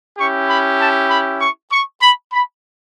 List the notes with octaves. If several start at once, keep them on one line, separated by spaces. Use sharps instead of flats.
C#4 E4 G4 C#6
B5
A5
B5
C#6
C#6
B5
B5